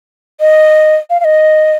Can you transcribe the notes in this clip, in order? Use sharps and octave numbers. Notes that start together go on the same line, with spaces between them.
D#5
F5
F5
D#5